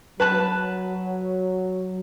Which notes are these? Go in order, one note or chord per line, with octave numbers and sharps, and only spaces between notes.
F#3 B4 A5 F#6